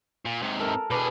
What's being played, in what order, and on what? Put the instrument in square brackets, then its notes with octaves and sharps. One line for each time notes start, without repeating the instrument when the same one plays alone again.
[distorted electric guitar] A#2
G#2 C3
[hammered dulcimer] A4 A#4
[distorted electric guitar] B2 G#4 [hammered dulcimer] B4 D5